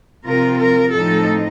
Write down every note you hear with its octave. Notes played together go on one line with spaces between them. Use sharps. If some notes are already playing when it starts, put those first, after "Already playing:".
C3 F3 C4 F4 A#4
A#4
A2 F3 C4 D#4 A4